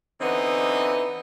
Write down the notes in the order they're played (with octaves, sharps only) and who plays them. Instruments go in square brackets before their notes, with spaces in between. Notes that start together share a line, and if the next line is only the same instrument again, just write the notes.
[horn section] D3 E3 B3 C4 D#4